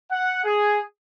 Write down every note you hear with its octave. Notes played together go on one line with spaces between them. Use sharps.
F#5
G#4